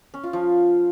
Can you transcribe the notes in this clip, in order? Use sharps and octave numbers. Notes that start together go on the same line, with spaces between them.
C#4
F4
F3